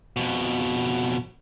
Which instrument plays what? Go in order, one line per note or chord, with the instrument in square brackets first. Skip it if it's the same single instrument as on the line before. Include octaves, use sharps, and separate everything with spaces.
[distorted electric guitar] F2 B2